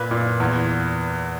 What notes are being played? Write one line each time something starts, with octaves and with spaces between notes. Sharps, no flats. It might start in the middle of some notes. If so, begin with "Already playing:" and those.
Already playing: A#2 B4
A#2
E2